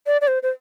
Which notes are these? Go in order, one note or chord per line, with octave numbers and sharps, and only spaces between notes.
D5
D5
C5
C5